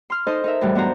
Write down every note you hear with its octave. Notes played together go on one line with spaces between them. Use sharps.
C6 F6
D#4 A4 C5 D#5 C6
D#4 A#4 E5
F#2 A2 E3 G3
B3 D4 F#4 C5 A#5